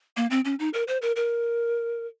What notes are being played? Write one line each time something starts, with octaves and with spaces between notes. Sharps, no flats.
A#3
C4
C#4
D#4
A#4
C5
A#4
A#4